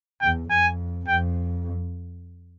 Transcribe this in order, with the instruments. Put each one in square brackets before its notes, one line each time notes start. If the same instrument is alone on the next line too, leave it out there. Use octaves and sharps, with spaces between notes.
[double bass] E2 [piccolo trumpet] G5
[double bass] F2 [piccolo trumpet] G#5
[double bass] F2 [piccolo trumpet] G5